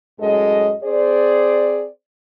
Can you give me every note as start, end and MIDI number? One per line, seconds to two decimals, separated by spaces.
0.20 0.72 42
0.20 0.72 45
0.20 0.72 56
0.20 0.72 69
0.20 0.72 75
0.83 1.86 60
0.83 1.86 68
0.83 1.86 72
0.83 1.86 74